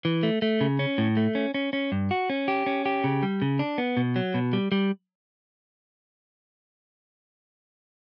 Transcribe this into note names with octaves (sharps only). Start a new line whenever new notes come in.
E3
A3
A3
C#3
C#4
A2
A3
C#4
C#4
C#4
G2
F#4
C#4
G4
C#4
G4
C#3
G3
C#3
D4
B3
B2
F#3
B2
G3
G3